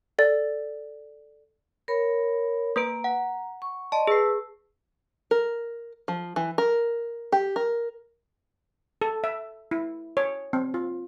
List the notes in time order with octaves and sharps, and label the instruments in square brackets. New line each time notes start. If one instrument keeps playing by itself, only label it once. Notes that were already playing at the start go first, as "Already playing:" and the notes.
[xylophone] A4 D5 A6
[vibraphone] A#4 C#5 B5
[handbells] A#3 B4 D7 [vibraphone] A#5
[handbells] F#5
[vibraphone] C#6
[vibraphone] D5 D#5 C6 [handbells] A5
[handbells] G#4 C7 [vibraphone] B4 E6
[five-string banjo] A#4
F3
E3
A#4
G4
A#4
[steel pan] A4
E5
E4
C#5
C4
F4